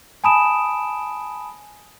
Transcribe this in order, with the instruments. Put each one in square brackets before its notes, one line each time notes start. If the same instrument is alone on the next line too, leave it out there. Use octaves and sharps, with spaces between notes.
[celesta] G#5 A5 B5 D#6 D7 E7